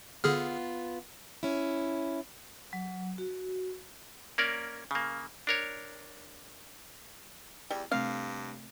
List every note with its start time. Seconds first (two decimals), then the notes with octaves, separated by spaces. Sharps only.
0.24 D3 B3 F4 G#4 F6
1.43 C#4 E4
2.73 F#3
3.18 F#4
4.38 A#3 C#4 A#4 D5
4.91 C#3 A#3
5.47 D4 A#4 C#5
7.70 E2 G3
7.91 G2 C3 A3 C4 F5